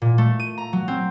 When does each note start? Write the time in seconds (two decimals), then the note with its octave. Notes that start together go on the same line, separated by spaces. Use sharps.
0.02 A#2
0.18 A3
0.40 D#7
0.58 A#5
0.73 F#3
0.88 C4